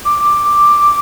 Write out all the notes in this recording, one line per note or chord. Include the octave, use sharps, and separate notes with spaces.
D6